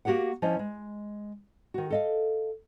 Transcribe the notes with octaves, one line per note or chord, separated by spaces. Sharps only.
A#3 F#4 G4 A#4 F#5
F3 C#4 E4 D#5
G#3
D#3 F#4
A4 D#5 F5